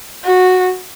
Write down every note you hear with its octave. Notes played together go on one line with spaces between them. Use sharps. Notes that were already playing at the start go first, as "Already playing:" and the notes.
F#4